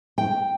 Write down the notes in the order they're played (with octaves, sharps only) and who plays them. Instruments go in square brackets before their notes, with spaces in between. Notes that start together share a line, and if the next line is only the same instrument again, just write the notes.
[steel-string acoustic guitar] G5